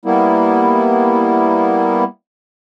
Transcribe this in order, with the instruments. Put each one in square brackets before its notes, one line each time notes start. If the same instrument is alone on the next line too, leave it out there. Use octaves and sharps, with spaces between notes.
[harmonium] G3 A#3 B3 E4